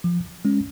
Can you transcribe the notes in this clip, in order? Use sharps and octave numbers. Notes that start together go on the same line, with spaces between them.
F3
G#3 C#4